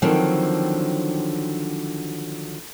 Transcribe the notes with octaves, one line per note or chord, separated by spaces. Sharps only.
D3 D#3 F3 F#3 C4